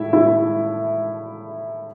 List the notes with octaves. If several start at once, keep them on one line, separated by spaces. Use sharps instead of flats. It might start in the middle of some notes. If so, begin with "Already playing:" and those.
Already playing: A2 E4 E5
E4 E5